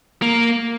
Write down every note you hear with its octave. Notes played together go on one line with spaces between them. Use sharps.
A#3